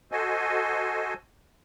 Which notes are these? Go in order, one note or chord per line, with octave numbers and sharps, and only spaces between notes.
F#4 A4 C5 D#5 G#5